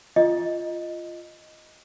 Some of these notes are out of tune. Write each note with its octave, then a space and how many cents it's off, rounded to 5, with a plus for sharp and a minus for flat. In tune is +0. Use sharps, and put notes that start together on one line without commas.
F4 -10 D#5 +0